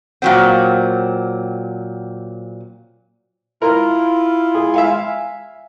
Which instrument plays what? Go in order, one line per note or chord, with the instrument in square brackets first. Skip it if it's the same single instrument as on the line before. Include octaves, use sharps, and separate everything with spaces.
[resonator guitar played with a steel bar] A#2 F#3 C4 [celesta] F#5 G5
[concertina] E4 F4 [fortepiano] A#4 A#5
[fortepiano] G#4
E5 F5 G#5